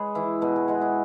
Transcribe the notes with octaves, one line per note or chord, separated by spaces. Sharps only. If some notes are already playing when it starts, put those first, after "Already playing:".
Already playing: G#3 G#4 B4 C#5
E3 E4
B2 F#4
G#4
G#3 F#4
E4